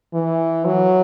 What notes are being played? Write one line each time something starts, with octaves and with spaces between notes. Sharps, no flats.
E3
F#3